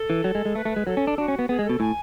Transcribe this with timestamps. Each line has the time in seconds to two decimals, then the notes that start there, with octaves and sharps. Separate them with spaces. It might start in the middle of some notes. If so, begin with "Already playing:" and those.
Already playing: A4
0.10 E3
0.24 F#3
0.35 G#3
0.45 G#3
0.55 A3 B4
0.65 A3
0.71 B4
0.76 G#3
0.87 F#3 A4
0.97 C#4
1.07 D4
1.18 D4 F#4
1.28 C#4
1.39 B3
1.49 B3 G#4
1.59 G#3
1.65 B2 A4
1.80 A2 G#5